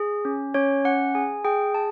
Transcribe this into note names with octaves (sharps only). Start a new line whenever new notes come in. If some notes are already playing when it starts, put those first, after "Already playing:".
Already playing: G#4
C#4
C#4 C#5
C#4 F#5
G#4 G#5
G#4 G5
G#4 A5